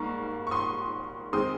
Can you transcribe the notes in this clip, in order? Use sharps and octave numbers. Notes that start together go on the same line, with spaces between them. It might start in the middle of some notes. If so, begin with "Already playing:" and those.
Already playing: G#2 G3 A#3 A#5 C#6
C#6
C6 D#6
D#3 G#3 C4 C6 D#6